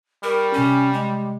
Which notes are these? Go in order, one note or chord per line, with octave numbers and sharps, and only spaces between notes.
G3 A#4 C#6
C3 C#4 G4 G6
G#3